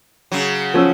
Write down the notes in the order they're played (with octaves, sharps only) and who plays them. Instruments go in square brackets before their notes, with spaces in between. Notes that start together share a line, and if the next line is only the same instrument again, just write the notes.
[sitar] C#3 F#3
[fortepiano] F3 C#4 E6